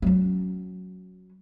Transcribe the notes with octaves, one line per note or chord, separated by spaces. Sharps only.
F#3 C#4